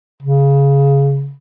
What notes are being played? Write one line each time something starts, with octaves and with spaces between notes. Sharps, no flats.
C#3